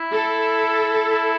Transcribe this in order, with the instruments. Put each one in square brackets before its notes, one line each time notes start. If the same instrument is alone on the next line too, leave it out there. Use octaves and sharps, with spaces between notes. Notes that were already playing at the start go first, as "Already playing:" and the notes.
Already playing: [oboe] E4
[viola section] A4
[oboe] E4